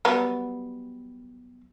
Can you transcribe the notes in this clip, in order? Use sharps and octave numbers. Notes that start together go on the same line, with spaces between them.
F#3 G3 B3